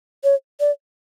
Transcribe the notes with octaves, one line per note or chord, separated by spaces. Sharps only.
C#5
D5